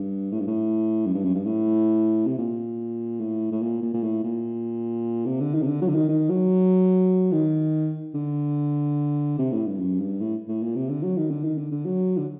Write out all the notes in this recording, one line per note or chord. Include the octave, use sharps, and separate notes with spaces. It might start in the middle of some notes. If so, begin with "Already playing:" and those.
Already playing: G2
A2
G2
A2
F#2
G2
F#2
G2
A2
C3
A#2
A2
A2
A#2
A#2
A#2
A2
A#2
C3
D3
D#3
C3
D3
F#3
D3
D#3
D#3
F#3
D#3
D3
C3
A2
G2
F#2
G2
A2
A2
A#2
C3
D3
F#3
D#3
D3
D#3
D3
D3
F#3
D3